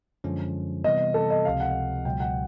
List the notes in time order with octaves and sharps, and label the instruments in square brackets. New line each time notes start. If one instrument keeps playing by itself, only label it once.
[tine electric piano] F#2 D3 F3 G#3 C#4
[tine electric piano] C3 E3 G3 B3 [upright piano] D#5
[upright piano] A4
D#5
[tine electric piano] C#2 C3 F3 [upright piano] F5
[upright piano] F#5
[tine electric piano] C#2 B2 F#3 [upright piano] G5
[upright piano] F#5